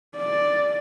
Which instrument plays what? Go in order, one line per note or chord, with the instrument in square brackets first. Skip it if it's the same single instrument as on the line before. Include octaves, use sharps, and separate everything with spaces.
[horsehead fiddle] D5